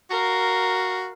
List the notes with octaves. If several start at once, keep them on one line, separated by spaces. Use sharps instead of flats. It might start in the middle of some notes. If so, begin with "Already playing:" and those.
F#4 A#4 F5